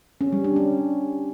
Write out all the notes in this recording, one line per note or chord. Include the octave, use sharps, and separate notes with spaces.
C#4
G3
D4
C#4